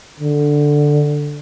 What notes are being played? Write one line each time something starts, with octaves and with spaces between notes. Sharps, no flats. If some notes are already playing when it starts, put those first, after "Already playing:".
D3